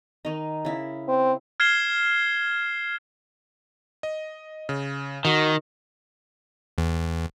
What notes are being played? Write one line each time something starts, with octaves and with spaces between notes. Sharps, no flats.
D#3 D#4
C#3 E4
C4
F6 G#6 C7 E7 G7
D#5
C#3
D#3 F#4 D#5
E2